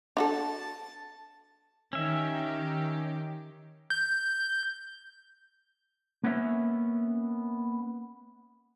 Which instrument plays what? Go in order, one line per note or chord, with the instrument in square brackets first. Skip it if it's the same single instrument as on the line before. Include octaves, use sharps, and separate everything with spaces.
[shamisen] D4 F#4 A4 [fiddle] A5
[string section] D#3 G4 [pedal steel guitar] C#4 E5
[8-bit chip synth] G6
[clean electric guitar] A#3 B3 C#4 C#5 E5